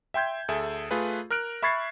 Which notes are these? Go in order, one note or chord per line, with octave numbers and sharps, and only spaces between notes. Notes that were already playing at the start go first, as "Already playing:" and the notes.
E5 G5 C6 G6 G#6
D2 G#4 A4 E5
A3 F4 G#4 B4
A#4 F6 F#6 D7
E5 B5 C#6 G#6 A6 C7